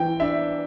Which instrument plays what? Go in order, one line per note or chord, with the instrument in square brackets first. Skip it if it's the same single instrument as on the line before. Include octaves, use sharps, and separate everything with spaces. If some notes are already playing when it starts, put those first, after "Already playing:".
Already playing: [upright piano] E3 [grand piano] G5
[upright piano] D4 [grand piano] E5